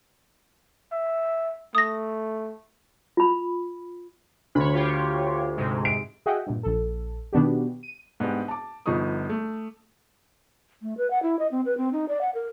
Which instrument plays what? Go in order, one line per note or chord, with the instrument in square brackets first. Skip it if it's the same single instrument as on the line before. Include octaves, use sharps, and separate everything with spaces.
[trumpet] E5
[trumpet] A3 [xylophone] D#6 A#6
[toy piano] F4 B5
[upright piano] D2 [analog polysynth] C#5 B5
[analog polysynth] F4 G4 C#5
G#2 C3 G#3
[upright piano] D7
[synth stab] F#4 G#4 D#5 E5 F#5 G5
G2 A#2
A#1 A4
B2 D#3 B3 D4 F#4 G4
D#7
[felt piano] G#2 B3 D4 G4
A5 D6
G1 F3 B3 D#4 C#6 D#6
A3
[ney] A3
B4
F#5
E4
D#5
C4
B4
C4
D#4
D5
F#5
A#4